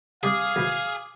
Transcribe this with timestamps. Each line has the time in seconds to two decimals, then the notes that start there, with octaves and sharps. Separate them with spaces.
0.23 C3 G3 G#4 F5 D6 D#6
0.56 E2 B2 F3